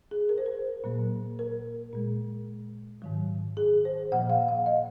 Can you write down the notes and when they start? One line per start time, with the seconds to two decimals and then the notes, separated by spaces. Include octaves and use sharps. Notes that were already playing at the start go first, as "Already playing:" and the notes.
0.11 G#4
0.29 A#4
0.38 C5
0.46 A#4
0.84 A#2 F#3 A#3
1.39 A#4
1.93 A#2 G#3
3.02 G#2 D#3 F#3
3.57 G#4
3.85 C5
4.12 A#2 F3 A#3 F#5
4.30 F5
4.48 F5
4.66 D#5